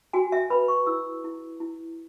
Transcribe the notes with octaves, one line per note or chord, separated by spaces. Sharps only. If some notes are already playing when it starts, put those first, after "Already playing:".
F#4 G#5
E5
B4 B5
C#6
E4 E6
E4
E4